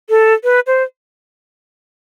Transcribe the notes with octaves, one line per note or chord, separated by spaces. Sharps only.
A4
B4
C5